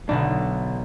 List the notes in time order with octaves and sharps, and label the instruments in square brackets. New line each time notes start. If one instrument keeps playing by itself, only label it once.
[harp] B1 B2 A3 [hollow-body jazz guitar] D3 D4